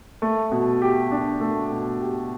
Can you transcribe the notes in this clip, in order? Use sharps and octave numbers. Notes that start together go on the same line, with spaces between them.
A3
B2
G4
D4
A3
B2
G4